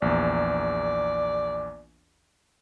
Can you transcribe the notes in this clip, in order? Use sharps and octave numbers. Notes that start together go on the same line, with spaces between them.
A#1 E2 D5